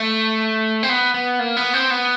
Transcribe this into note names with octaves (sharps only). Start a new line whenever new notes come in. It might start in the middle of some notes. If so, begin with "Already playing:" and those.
Already playing: A3
C4
B3
B3
A#3
B3
C4
B3